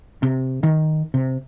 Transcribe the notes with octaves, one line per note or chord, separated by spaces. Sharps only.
C3
D#3
C3